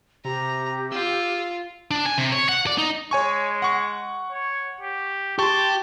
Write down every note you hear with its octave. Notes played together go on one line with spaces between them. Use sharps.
C3 G4 A#5
F4 E6
D4
G#5
C3
C#5
F#5
D5
D#4
G#3 C#5 G#5 C#6
F#5 C#6
C#5
G4
G4 A5 C6 C#6